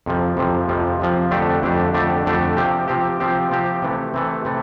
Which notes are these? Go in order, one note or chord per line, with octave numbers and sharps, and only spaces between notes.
F2 C3 F3
F2 C3 F3
F2 C3 F3
F2 C3 F3
F2 D3 A3 D4 G4
F2 D3 A3 D4 G4
F2 D3 A3 D4 G4
F2 D3 A3 D4 G4
C3 F3 C4 G4
C3 F3 C4 G4
C3 F3 C4 G4
C3 F3 C4 G4
C3 E3 A3
C3 E3 A3
C3 E3 A3